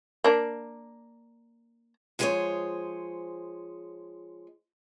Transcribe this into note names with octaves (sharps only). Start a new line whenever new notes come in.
A#3 D4
F3 G#3 G#4 A4 C5 C#5